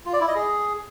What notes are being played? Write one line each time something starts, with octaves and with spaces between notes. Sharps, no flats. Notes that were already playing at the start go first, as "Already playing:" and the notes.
F4
D5
E4
D#5
G#4